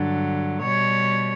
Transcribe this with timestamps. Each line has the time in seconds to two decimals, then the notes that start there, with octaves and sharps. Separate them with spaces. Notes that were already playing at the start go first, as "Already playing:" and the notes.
Already playing: G2 D3 F#3
0.61 B2 G3 C#5